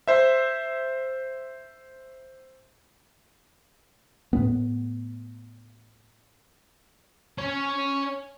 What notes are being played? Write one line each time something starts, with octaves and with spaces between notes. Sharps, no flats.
C5 E5
A2 B3
C#4 C#5